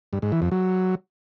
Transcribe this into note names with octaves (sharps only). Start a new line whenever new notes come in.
G2
G#2
E3
F2
F#3